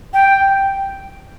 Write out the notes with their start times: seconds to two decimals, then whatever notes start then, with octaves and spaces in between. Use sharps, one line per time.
0.14 G5